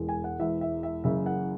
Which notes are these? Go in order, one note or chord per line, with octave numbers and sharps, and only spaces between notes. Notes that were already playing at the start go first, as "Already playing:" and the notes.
Already playing: E1 E2 E3 G#3
G#5
F#5
E1 E2 E3 G#3 E5
E5
E5
F#1 F#2 C#3 E3 E5
F#5